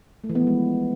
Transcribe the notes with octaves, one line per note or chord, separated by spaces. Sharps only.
A3
E3
B3
F3
G#3